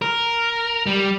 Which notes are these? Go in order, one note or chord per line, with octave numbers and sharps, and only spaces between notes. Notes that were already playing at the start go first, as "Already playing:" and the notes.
A#4
G3